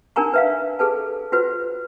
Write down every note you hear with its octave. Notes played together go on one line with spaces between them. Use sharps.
D4 D#4 A#4 G#5 A#5 C#6
B4 E5 F5
G#4 A4 B4 A5
F4 F#4 B4 C5